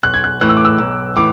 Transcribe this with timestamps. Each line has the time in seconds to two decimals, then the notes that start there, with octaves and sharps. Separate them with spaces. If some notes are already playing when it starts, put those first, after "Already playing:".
0.03 B1 F#6
0.14 G#6
0.24 F#6
0.41 A2 E3 A3 F#6
0.49 E6
0.57 D6
0.65 E6
0.78 B1
1.16 A2 E3 D6